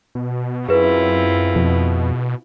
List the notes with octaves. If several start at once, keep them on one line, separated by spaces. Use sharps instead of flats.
B2
F#2 C4 E4 F4 G#4 B4
F2 B2